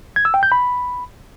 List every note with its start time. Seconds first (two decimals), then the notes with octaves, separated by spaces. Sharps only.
0.16 G#6
0.25 E6
0.34 G5
0.43 G6
0.52 B5